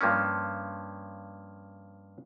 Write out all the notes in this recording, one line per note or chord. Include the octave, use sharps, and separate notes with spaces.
G2 F3 A#3 C#4